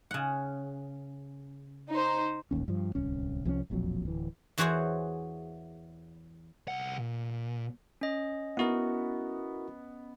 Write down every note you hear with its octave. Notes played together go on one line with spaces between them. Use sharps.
C#3 F#5
D#4 C5
D#1 A1 D#2 C#4
G2 F3
D1 C2 C#4
C2 F3 G#3 C#4
E1 A#1 F2 F#3
D1 E3
E2 E3 F#4 G#4 C5 C#5
C2 F#5
A#2
C#4 D#5
B3 E4 F#4 A#4